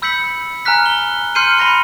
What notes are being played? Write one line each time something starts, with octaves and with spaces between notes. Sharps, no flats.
B5 E6 G6 B6 C#7 F#7
G#5 A#5 F6 F#6 B6
G7
C6 F6 G6 C7 C#7 D#7
B5 C6 A#6 C#7 G7